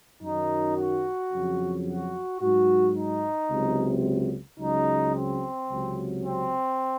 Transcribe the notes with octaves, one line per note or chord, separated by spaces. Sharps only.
F#2 D#3 F#3 D#4
F#4
F2 C#3 F#3
F#4
G#2 F#3 F#4
D#4
C#2 C3 F#3
C#2 C#3 F#3 D#4
C4
C#2 C3 F#3
C4